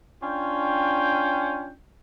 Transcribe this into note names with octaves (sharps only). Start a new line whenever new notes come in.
C#4 D4 F4 G5